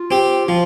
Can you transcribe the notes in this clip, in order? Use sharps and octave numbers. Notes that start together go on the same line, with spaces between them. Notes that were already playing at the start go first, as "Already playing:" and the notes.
Already playing: F4
C4 G4
F3 F4